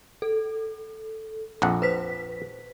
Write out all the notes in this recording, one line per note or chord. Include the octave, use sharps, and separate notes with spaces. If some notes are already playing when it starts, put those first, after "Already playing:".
A4
A#1 F2 F#5
B4 C5 B6